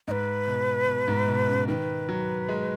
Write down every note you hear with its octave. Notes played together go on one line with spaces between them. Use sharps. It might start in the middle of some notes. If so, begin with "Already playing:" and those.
G#2 B4 D#5
B2
B2
G#2
B2
C#3
D#3 B4
F#3
G#3